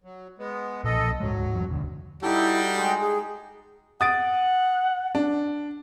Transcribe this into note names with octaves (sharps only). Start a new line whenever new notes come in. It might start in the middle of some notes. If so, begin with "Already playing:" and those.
F#3
G#3 B3
B1 A#2 A4 D#5
D1 G#2 F#3 G#3
E2 G2 F3
E1 D2 D3
G3 D#4 E4 F#4 G4 A4
G#3 G5
G#4
F#5 D#6 A6 D7
D4